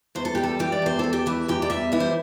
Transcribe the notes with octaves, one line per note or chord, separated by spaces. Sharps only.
E2 C5
A4
G3 G4
A4
E3 G4
D5
E2 C5
E2 A4
G4
E3 E4
E2 G4
D5
G3 E5
E3 E4
C5